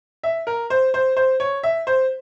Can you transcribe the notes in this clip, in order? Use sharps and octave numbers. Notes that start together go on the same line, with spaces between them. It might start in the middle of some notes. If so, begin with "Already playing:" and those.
E5
A#4
C5
C5
C5
C#5
E5
C5